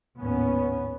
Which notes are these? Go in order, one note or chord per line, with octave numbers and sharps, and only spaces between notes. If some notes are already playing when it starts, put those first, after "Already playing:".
G#1 D#2 A2 B3 C#4